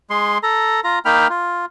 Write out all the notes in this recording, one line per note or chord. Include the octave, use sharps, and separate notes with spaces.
G#3 C6
A4 A#5
F4 A#5
A#3 D#4 G5 B5 F6
F4